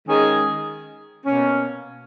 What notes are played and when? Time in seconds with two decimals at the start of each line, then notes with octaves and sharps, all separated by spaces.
0.07 D#3 G#3 C#4 G#4
1.26 B2 A#3 C#4